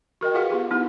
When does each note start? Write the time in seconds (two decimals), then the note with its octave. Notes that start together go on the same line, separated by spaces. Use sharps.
0.21 F#4 A#4 D#5 G5
0.34 F4 F#4 G#4 B4 F5 F#5
0.50 B3 F4 G4
0.71 B3 D#4 E4